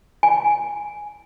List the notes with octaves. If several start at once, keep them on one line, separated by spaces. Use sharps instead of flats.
G#5